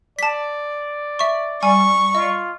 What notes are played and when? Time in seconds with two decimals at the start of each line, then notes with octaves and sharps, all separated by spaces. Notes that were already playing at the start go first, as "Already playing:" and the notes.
0.19 D5 A5 B6
1.19 E5 C#6
1.63 G3 G#5 C#6
2.15 F4 D#5